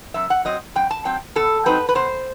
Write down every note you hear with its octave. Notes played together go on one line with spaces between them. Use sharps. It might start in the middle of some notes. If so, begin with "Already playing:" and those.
F#2 E5
F#5
F#3 C4 D#5
F#2 G5
A5
F#3 C4 G5
B2 A4
F#3 C4 D#4 B4
B4
B2 C5